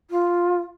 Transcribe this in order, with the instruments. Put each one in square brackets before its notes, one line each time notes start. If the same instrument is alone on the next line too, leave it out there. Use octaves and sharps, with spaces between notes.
[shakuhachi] F4